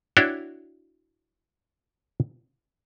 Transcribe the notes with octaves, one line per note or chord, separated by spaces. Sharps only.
D4 E4 F#4 C#5 G5